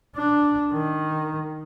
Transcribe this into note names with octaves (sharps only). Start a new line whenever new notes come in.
D4
D#3